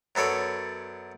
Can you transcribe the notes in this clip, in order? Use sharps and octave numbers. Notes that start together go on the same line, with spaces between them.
F#2 B3 A4 C#5 D5